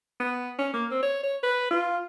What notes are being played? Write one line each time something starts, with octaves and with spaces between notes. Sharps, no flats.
B3
C#4
A#3
C4
C#5
C#5
B4
F4